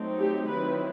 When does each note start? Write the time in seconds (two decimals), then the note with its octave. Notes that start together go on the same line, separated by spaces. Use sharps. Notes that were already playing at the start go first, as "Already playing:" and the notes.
Already playing: F#3 A3 C4 D#4
0.19 G4
0.48 D#3 F#3 C4 E4 B4